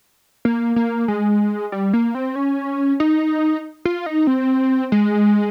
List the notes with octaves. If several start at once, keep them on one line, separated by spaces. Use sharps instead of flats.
A#3
A#3
G#3
G3
A#3
C4
C#4
D#4
F4
D#4
C4
G#3